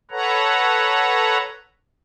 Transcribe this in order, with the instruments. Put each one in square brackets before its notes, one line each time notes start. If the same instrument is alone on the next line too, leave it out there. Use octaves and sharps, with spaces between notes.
[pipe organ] A4 B4 C#5 F#5 A#5